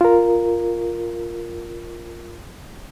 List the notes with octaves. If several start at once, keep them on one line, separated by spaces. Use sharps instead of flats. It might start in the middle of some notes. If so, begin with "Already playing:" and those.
F4 A#4